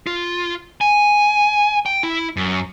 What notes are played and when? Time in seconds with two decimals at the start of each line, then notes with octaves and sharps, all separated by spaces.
0.07 F4
0.81 G#5
1.86 G5
2.03 E4
2.37 F#2